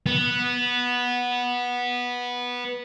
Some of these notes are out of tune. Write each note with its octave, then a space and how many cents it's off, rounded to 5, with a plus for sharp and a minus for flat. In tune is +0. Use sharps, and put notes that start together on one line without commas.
B3 -10